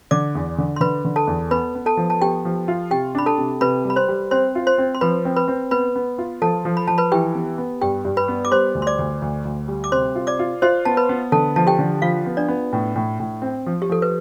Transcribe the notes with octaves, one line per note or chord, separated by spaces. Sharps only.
D3 D5 D6
E2
D3
C6
D3 B4 B5
D3
A4 A5
E2
B3 B4 B5
B3
A4 A5
F3
A5
B3 G4 G5
F3
F4
C3 G4 G5
D4 B5
A4 A5
C3
C3 B4 B5
G3
B5
C5 C6
G3
C4 C5 C6
F4
C5 C6
C4
C6
F3 B4 B5
C4
B4 B5
C4
B3 B4 B5
B3
F4
F3 A4 A5
F3
B5
F3 A5
B4 B5
E3 G4 G5
B3
B3
G2 G4 G5
G2
B4 B5
B3
D6
G3 C5 C6
D2
C6
D5 D6
D2
D2
D2
G3
D6
C3 C5 C6
F4
D5 D6
F4
F4 C5 C6
B3 A5
B4 B5
B3
D3 A4 A5
F3 A5
G4 G5
D3
F3 F4 F5
B3
D4 D5
B3
A2
A2
A2
C4
F3
G4
F3 A4
B4